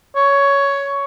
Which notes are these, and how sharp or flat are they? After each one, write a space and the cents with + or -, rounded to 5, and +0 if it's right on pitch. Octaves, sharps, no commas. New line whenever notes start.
C#5 +10